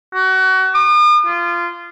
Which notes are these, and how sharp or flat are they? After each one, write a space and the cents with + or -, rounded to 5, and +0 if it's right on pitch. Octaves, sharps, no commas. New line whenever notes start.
F#4 +30
D#6 -45
F4 -20